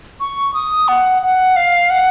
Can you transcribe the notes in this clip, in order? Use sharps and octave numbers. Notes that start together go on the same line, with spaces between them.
C#6
D#6
F#5
F#5
F5
F#5